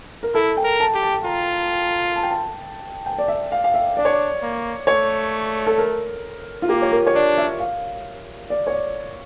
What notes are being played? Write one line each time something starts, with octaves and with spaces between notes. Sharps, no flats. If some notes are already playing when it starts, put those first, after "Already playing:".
A#4
E4 A4
G5
A#4
A5
G4
A5
F4 A#5
A5
G5
A5
G5
D5
E5
F5
F5
E5
D4 D5
C#5
D5
A#3
A3 C#5
A4
A#4
F4
A#3 G4
C#5
A#4
C#5
D4 D5
E5
F5
D5
C#5
D5